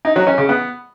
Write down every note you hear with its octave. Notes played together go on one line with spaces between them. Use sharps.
D#4
F#3
C#4
C#3
B3